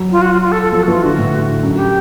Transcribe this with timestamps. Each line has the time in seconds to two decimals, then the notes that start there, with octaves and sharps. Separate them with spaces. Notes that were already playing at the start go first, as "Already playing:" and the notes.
Already playing: F#3
0.12 F4
0.22 F#4
0.32 F4
0.42 F4
0.52 A4
0.62 A4
0.72 F3 A4
0.83 F#4
0.88 E3 F4
1.03 D3 F#4
1.18 A2
1.63 F#2
1.74 F#4
1.78 G4